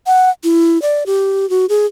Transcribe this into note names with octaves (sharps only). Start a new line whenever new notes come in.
F#5
E4
D5
G4
F#4
G#4